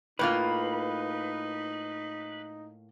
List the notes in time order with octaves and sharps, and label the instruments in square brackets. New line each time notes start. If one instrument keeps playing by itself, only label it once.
[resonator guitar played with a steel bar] A2 A#3 F4 [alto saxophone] D#4 [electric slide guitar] B4